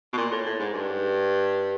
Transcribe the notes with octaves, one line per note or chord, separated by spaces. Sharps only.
B2
A#2
A2
A2
G#2
G2